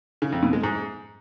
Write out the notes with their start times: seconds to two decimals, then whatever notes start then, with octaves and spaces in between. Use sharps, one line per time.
0.22 C#3
0.32 F2
0.43 B2
0.53 G#3
0.64 G#2